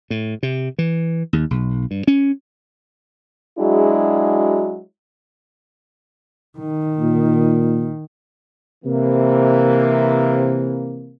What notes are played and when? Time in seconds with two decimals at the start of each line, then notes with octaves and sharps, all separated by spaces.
0.10 A2
0.43 C3
0.78 E3
1.33 D#2
1.51 B1
1.91 G2
2.07 C#4
3.59 F#3 G#3 D4 E4 F#4 G#4
6.58 D#3
6.99 A#2
8.85 C3 E3 A#3